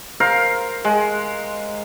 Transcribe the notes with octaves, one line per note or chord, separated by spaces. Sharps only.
A#4 C5 F5
G#3